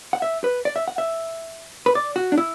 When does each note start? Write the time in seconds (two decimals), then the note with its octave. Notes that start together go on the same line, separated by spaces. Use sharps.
0.13 F#5
0.22 E5
0.44 B4
0.65 D5
0.76 E5
0.88 F#5
0.98 E5
1.86 B4
1.95 D5
2.16 F#4
2.32 D4
2.38 E4